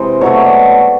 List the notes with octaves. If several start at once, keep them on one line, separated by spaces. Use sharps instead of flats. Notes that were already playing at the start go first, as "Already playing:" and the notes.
Already playing: C3 E3 G#3 C5
B2 F#3 A3 C#5
D5